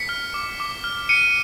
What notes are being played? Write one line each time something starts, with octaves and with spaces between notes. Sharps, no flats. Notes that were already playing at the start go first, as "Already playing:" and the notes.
Already playing: B6 C#7
F6
D6
D6
F6
F6 C#7 D#7